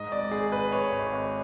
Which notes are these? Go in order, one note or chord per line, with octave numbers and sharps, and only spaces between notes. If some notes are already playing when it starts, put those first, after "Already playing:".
Already playing: G#2 D#5
G#1 D5
G#1 G#4
G#1 B4
G#1 C#5
G#1
G#1